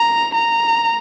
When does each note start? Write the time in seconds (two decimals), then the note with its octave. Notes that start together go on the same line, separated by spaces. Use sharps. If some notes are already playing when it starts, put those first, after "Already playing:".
Already playing: A#5
0.35 A#5